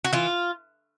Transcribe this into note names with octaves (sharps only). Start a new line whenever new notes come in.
F#4
E3 F4